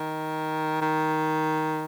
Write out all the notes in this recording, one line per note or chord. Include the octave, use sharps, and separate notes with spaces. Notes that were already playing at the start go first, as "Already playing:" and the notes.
Already playing: D#3
D#3